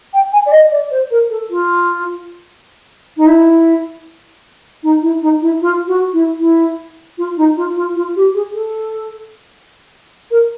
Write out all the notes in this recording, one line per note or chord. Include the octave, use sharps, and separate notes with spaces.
G5
G#5
D5
D#5
D5
C5
A#4
A4
F4
D#4
E4
D#4
E4
D#4
E4
F4
F#4
E4
E4
F4
D#4
F4
F4
F4
G4
G#4
A4
A#4